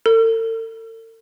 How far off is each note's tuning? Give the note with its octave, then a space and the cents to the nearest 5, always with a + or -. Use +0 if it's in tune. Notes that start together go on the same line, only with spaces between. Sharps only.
A4 +45